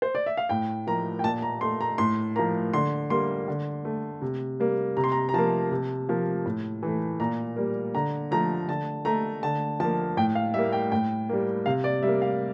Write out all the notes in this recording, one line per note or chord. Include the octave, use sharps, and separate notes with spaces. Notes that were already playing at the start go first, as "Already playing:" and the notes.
C5
D5
E5
F5
A2 G5
F3 A#3 A#5
G5
A#2 A5
A#5
A3 C6
A#5
A2 C6
F3 A#3 A#5
D3 C6
G3 A#3 C6
D3
A3
C3
G3 A#3
C3 A#5
C6
A#5
A#5
F3 A#3 A5
C3
F3 A#3
A2
E3 A3
A#2 A#5
G3 A#3
D3 A#5
F3 A3 A#5
D3 A5
A3 A#5
D3 A5
F3 A#3 A5
A2 G5
F5
G3 A#3 E5
G5
A2 G5
G3 A#3
C3 F5
D5
G3 A#3 E5
F5